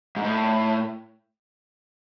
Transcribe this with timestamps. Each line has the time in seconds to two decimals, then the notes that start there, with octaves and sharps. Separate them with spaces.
0.16 G#2
0.25 A2